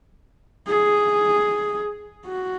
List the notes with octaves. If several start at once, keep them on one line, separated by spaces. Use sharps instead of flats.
G#4
F#4